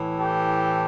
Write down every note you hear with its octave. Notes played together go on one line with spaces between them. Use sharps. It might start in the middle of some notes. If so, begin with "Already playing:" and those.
Already playing: A2 E3
G4 A4